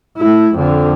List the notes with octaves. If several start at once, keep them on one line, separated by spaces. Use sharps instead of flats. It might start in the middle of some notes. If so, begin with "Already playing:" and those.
A3 E4
F2 D3